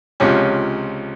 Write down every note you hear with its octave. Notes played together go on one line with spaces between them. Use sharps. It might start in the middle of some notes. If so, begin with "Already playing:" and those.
C#2 C3 F3 C#4